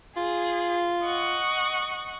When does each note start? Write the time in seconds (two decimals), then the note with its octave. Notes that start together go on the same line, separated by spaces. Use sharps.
0.17 F4 G#4
1.03 D#5 F#5 C#6